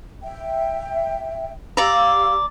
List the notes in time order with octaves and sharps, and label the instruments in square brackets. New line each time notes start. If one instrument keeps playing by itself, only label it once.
[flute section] E5 G5
[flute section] G4 F5 E6 [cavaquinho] D5 A#5